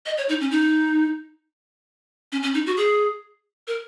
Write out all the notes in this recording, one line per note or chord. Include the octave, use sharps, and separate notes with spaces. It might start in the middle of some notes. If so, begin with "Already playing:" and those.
D#5
C#5
D#4
C#4
D#4
C#4
C#4
D#4
F#4
G#4
A#4